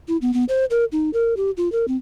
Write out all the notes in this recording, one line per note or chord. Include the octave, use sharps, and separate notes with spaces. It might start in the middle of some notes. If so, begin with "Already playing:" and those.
E4
B3
B3
C5
A#4
D#4
A#4
G4
F4
A#4
C4